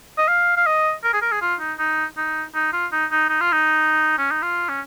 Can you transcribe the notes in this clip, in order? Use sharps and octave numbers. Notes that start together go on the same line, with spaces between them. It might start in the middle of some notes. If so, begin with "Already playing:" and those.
D#5
F5
F5
D#5
A#4
G#4
A#4
G#4
F4
D#4
D#4
D#4
D#4
F4
D#4
D#4
D#4
F4
D#4
C#4
D#4
F4
C#4